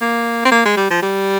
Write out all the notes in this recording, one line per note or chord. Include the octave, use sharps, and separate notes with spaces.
A#3
C4
A#3
G#3
G3
F3
G3